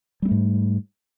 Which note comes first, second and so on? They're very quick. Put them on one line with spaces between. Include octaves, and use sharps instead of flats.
G3 C4 A3 G#2